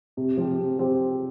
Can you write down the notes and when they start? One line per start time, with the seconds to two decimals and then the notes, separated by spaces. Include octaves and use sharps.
0.17 C3
0.37 F3 C4 G4
0.58 C3
0.79 F3 C4 G4